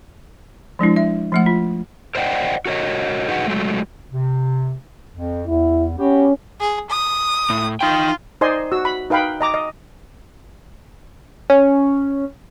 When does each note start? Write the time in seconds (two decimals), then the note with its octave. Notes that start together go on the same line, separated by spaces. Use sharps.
0.79 F3 G#3 D4 E4
0.96 E5
1.32 F3 A3 F#5
1.46 F4
2.15 A#4 C5 D5 D#5 F#5 G5
2.66 F#4 A#4 C#5 D#5
3.28 D#4 F#4 G#4 B4 D#5 F#5
3.46 F#3 G#3 A3
4.11 C3
5.15 F2
5.47 E2 E4
5.98 B3 C#4 F#4 G4
6.60 G#4
6.90 D#6
7.50 A2
7.81 D#4 F4 G5
8.41 D#4 C5 D5 D#5 G#5 C6
8.72 F#4 E6
8.85 B5
9.10 D#4 B4 F5 G5 B5
9.41 D#5 A#5 D6
9.54 D#5
11.50 C#4